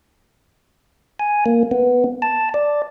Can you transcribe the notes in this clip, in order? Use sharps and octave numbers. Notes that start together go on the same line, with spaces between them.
G#5
A#3
B3
A5
D5